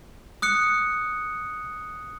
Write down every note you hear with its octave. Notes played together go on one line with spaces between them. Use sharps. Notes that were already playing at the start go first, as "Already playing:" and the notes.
D#6 F#6 C#7